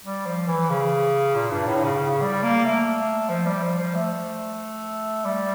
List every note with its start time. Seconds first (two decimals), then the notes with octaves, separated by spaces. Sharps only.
0.05 G3
0.26 F3
0.48 E3
0.70 C#3
1.35 A#2
1.51 G2
1.67 A2
1.83 C#3
2.00 C#3
2.21 G3
2.43 A#3
2.65 A3
3.29 F3
3.46 G3
3.63 F3
3.78 F3
3.95 A3
5.25 G3